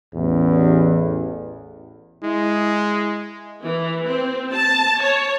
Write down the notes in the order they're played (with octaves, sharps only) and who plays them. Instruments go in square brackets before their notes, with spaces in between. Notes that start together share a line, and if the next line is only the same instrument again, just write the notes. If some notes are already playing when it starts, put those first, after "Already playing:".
[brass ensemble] A1 [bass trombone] E2
[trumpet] G#3 [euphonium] E4
[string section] E3
C4
A5
C#5